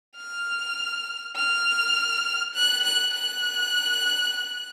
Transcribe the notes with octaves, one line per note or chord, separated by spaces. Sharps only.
F6
F6
F#6
F#6
F#6